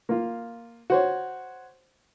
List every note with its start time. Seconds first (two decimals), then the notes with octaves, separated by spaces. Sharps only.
0.09 A#3 F4
0.90 F#4 C5 C#5